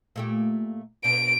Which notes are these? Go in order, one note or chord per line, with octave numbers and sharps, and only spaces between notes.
A#2 A3 G4
B2 D4 D7